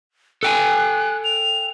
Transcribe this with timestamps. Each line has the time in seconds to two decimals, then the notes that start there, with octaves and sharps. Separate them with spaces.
0.43 A4 G5 G#5 F#6
1.24 F7